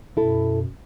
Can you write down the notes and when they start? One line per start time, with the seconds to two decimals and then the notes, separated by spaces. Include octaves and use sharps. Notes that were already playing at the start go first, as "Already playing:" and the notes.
0.17 F#2 B2 E4 A4